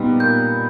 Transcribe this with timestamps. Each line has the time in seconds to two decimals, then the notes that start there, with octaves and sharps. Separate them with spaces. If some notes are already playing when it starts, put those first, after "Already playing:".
Already playing: A#2 G3 B3 D#4 G4
0.20 A#2 G6